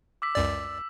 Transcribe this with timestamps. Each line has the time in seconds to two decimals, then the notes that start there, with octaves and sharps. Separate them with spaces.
0.22 D6 E6 B6
0.35 C#2 F#2 D5